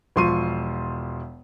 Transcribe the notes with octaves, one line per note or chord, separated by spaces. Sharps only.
E1 F3 C6 C#6 D#7